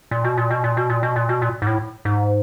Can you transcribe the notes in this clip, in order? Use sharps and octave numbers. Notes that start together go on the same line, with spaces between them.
A#2
B2
A#2
B2
A#2
B2
A#2
B2
A#2
B2
A#2
G#2
A2
G#2